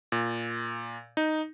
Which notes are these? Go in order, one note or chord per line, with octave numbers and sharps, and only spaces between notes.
A#2
D#4